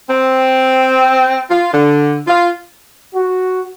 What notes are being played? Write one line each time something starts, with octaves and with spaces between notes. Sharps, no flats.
C4
F4
D3
F4
F#4